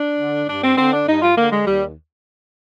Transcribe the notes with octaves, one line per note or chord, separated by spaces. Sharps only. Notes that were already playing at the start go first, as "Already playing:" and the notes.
Already playing: D4
D3
G2 D4
C4
D3 C4
D4
G2 D#4
F4
D3 A#3
G#3
D#2 G3